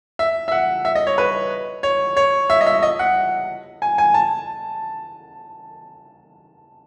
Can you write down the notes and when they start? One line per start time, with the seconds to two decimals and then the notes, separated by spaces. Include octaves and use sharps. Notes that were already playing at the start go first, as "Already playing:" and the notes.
0.19 E5
0.48 E5
0.52 F#5
0.85 E5
0.95 D#5
1.07 C#5
1.18 B4
1.83 C#5
2.17 C#5
2.50 E5
2.61 D#5
2.67 E5
2.83 D#5
2.99 F#5
3.82 G#5
3.98 G#5
4.14 A5